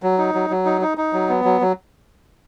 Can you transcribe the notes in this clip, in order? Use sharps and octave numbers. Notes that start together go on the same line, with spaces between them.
F#3
D#4
F#3
F#3
D#4
D#4
D#4
F#3
B3
F#3
F#3